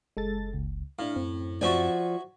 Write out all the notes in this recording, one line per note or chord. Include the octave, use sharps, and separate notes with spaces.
F#1 G#3 A4 A6
C#2
A2 D4 E4 F5
F#2 C4
F3 F#4 D5 E5 G#5